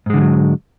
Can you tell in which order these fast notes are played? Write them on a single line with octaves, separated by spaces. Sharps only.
G#2 G#3 D3 E3 F#3